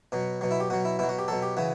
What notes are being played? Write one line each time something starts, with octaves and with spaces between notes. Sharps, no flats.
B2 F#3
B2 F#3
E4
G4
B2 F#3 F#4
E4
B2 F#3 E4
F#4
G4
B2 F#3 A4
G4
C#3 E3 F#4